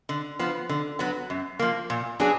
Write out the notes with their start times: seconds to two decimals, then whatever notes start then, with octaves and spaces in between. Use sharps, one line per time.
0.09 D3
0.39 F3 B3
0.69 D3
0.99 F#3 B3
1.30 F#2
1.59 F3 A#3
1.90 A#2
2.20 F#3 B3 D4 G#4